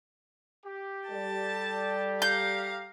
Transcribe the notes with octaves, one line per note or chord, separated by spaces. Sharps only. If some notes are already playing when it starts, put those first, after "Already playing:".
G4
G3 A4 D5 A5
F5 A#5 G6